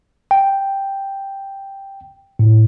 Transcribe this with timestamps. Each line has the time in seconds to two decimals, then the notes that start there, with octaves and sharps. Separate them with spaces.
0.31 G5
2.39 A2